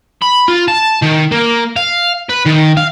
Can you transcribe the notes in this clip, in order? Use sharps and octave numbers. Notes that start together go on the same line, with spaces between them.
B5
F4
A5
D#3
A#3
F5
B4
D#3
F5